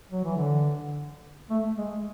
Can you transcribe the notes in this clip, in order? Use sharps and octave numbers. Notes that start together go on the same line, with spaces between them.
F#3
E3
D3
A3
G#3